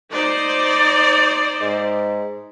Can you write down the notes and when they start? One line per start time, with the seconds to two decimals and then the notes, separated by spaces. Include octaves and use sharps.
0.12 D#4 C5 D5
1.61 G#2